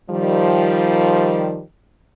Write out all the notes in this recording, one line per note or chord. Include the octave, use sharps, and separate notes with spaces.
D#3 F3 G3